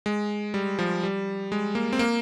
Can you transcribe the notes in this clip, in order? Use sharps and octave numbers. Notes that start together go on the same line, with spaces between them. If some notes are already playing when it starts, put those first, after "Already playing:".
G#3
G3
F3
G3
G#3
A#3
C4
A#3